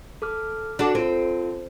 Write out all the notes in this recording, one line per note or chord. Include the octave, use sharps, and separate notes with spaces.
A4 D6 F6
D4 F#4 A4
C4 F4 A4